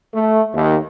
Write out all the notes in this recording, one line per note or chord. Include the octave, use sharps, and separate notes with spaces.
A3
D#2